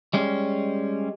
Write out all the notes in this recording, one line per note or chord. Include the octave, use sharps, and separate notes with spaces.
G3 G#3 C#4